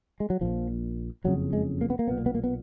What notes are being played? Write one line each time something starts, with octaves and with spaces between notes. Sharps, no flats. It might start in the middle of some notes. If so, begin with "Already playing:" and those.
G#3
F#3
A#1 A#2 F3
F#1 F2 C#3 F#3
G#3
A#3
B3
A#3
B1 A#2 B3
A#3
B3
A#3
B3